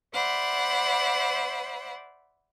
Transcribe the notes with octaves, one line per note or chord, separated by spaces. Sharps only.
C5 D5 E5 F#5 B5